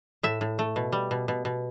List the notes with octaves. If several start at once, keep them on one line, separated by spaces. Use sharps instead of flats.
A2 E5
A2
A3
B2
G3
B2
B2
B2